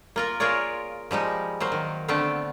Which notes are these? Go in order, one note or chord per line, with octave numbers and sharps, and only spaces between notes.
A#3 F4 A#4
F4 G#4 A#4 C#5 D5
F3 G3 G#3 D#4
F#3 A#3 C5
D#3
D3 A3 B3 C4 F5